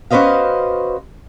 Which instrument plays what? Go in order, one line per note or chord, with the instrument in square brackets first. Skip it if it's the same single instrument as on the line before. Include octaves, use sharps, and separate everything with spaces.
[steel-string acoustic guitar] C#4 F#4 B4 C5 D#5 F5